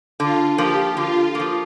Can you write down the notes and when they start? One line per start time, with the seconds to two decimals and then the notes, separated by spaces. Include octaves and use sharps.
0.19 D3 F4
0.58 F3 A#3 G4
0.97 D3 F4
1.35 F3 A#3